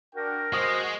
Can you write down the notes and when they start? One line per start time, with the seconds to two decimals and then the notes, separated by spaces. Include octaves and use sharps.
0.15 D4 F#4 A#4 G5
0.53 G#3 F#4 C5 D#6